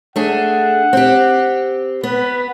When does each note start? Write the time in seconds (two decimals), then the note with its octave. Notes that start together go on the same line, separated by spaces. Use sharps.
0.16 A3 D4 G#4 F#5
0.93 C4 G4
2.03 B3 B4